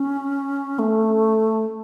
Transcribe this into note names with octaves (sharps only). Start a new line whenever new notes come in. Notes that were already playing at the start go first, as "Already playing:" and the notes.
Already playing: C#4
A3